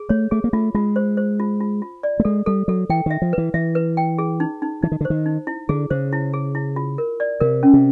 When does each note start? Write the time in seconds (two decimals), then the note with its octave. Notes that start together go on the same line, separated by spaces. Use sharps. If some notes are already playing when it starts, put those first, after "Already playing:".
Already playing: G#4
0.09 A3 C#5
0.31 A3 G#4
0.44 A#3
0.53 A3 F4
0.74 G#3 F4
0.96 C5
1.17 C5
1.40 F4
1.60 F4
1.82 F4
2.03 D5
2.20 A3
2.25 G#3 A4
2.46 G3 A4
2.68 F#3 A4
2.89 E3 G5
3.06 D#3 E5
3.22 F3
3.33 E3 B4
3.54 E3 E5
3.75 B4
3.97 G5
4.18 G#4
4.40 D#4
4.62 D#4
4.83 E3 D#4
4.92 D#3
5.01 D3
5.05 C5
5.10 D#3
5.26 D#4
5.47 E4
5.69 D3 G#4
5.90 C#3 C5
6.13 E4
6.33 G#4
6.55 E4
6.76 F4
6.98 A#4
7.20 D5
7.41 C3 A#4
7.63 C#4
7.73 C3